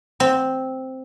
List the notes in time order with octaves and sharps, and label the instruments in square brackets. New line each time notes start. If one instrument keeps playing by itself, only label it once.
[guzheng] C4